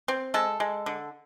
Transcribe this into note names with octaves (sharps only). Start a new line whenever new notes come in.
C4
G#3 A4
G#3
D3